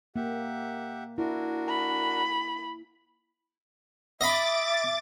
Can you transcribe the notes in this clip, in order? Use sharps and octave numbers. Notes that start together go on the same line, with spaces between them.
A#3 G4 E5 F#5
D4 E4 F#4 A#4
B5
D#5 E5 B5 D6 A6